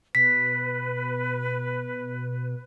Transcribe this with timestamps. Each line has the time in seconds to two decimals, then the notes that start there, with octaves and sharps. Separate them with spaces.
0.15 B2 B4 B6